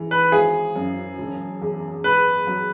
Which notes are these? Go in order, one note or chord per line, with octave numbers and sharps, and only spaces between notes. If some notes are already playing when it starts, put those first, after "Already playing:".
Already playing: G#2 E3
B4
G#1 G#4
F#2
E1
E2
G#2 B4
F#3